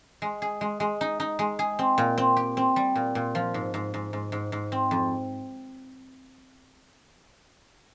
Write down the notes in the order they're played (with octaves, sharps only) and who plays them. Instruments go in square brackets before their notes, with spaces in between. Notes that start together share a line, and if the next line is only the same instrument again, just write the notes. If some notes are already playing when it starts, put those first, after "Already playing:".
[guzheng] G#3
G#4
G#3
G#3
D#4
D#4
G#3
G#4
C4
A#2
C4
G4
C4
G3
A#2
A#2
F3
G#2
G#2
G#2
G#2
G#2
G#2
C4
F2